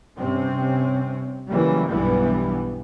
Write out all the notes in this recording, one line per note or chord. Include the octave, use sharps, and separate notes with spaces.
G2 C3 C4 C#4
C#3 E3 F#3 G3 A#3
B1 G2 E3 G3 B3